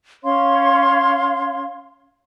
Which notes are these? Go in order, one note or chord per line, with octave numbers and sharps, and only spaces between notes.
C#4 C#5 F5 C6